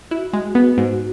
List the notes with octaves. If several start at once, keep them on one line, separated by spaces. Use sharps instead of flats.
E4 F#4
G#3
B3 F#4
G#2